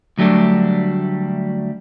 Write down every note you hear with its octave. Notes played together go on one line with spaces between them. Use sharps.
D2 F#3 G3 A3 D4